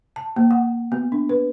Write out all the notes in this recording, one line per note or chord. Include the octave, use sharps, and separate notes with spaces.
A5
A#3
F#5
B3
D4
B4